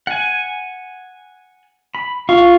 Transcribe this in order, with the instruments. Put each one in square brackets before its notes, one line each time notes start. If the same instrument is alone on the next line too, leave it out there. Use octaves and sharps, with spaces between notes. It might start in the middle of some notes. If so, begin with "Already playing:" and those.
[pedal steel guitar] F#5 G#5
B5
[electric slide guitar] F4 [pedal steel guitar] C#6